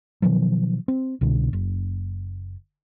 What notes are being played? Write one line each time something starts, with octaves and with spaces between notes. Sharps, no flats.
B2 D#3 F3 F#3
C4
C2 B2 D3
F#1